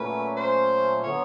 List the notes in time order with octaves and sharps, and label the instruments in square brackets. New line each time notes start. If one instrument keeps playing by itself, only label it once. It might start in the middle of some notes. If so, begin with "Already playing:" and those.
Already playing: [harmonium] A#2 F#3 A3 C#4 [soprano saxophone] B4
[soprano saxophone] C5
[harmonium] D3 F#3 B3 [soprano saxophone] C#5